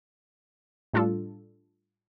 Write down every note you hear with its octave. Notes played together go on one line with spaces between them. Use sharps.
A2 G3 D4 F4 A4